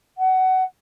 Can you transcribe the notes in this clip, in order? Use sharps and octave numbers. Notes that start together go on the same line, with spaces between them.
F#5